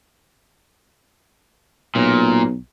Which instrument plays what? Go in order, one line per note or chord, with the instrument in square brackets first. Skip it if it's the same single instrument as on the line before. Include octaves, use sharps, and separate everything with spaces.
[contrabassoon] B1 [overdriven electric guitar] A#2